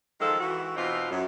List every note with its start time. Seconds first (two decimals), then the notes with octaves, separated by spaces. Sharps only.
0.20 D#3 F3 G#3 F4 A4
0.40 E3 F#4
0.76 B2 E3 C4 D#4 F4
1.11 F#2